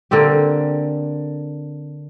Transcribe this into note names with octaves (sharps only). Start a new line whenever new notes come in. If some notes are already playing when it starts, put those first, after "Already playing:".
D3 A#3 C4 G4